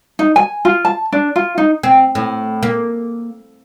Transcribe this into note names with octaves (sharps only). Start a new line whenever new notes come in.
D#4
G#5
F4
A5
D4
F4
D#4
C4
A2
A#3